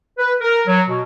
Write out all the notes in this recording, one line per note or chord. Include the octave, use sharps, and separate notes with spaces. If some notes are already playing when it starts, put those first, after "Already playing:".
B4
A#4
F#3
B2